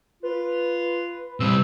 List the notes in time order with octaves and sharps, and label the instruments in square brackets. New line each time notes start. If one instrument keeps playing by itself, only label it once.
[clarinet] F4 [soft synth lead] B4
[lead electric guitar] C3 G3 [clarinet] E6